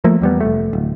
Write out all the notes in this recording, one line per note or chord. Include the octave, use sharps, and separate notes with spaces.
F3 A3 A#3
E2 G3 B3
F1 A3
D1